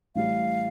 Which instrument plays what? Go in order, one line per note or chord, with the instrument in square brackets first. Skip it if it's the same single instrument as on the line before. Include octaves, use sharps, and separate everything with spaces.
[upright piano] A1 A2 G3 [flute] F5